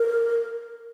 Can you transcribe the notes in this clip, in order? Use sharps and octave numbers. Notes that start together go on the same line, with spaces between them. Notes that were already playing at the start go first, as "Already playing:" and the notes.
Already playing: A#4